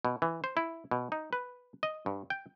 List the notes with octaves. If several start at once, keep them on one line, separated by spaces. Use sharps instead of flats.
B2
E3
C5
E4
B2
D#4
B4
D#5
G2
G5